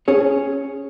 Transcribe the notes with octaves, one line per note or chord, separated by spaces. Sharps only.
C#4 G#4 C#5